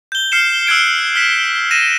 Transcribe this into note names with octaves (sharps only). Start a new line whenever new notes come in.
G6 G7
F6 C7 C#7 E7
E6 F#6 G#6 D7
F6 B6 E7
A#6 D#7 E7